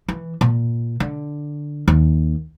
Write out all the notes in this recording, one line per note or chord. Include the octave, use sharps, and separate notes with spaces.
E3
A#2
D3
D#2